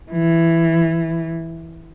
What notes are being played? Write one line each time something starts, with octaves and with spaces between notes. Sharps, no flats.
E3